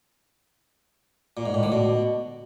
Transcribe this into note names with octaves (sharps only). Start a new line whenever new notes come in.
A#2
G#2
A2
D3
B2